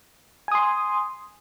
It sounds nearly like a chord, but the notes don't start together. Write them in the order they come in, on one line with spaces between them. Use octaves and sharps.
G#5 D#6 C6